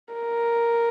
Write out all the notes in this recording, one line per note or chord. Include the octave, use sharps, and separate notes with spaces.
A#4